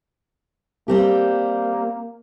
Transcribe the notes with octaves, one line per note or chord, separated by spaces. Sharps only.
G3 A#3 C4 G4